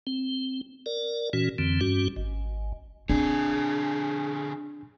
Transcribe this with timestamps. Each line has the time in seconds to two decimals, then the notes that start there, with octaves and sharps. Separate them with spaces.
0.07 C4
0.86 A#4 D5
1.33 A#2 E3 C#4 F#4
1.58 F2 D3 E3 C4
1.81 G2 G3 C#4 F#4
2.16 G#1
3.09 D3 C4 D4 G#4